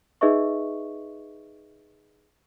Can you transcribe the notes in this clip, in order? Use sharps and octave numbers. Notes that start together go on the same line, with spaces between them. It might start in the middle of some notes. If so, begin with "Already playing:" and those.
D#4 G#4 B4 D#5 E5 C#6